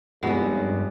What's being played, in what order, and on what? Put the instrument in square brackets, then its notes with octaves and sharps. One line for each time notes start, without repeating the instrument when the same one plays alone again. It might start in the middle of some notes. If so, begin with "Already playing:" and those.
[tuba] F1 [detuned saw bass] G2 [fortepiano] E3 B3 F#4 [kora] G3 G#3